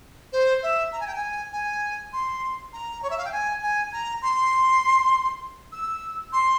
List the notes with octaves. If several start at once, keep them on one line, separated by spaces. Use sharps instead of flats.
C5
E5
A#5
G#5
G5
G#5
G#5
C6
A#5
C#5
E5
F5
G5
G#5
G#5
A#5
C6
E6
C6